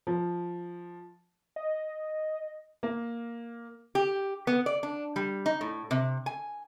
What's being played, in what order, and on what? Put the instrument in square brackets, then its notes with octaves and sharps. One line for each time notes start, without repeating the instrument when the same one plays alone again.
[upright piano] F3
[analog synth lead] D#5
[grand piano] A#3
[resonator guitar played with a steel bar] G4
B3
D5
D4
G3
D#4
A2
C3
G#5